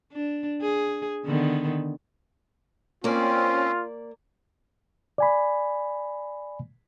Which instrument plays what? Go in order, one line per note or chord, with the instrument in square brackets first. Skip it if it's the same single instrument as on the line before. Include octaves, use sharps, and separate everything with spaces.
[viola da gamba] D4
G#4
D3 D#3 B3
[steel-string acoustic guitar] A#3 D5 [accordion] C4 C#4 [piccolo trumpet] F4
[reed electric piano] D5 G#5 B5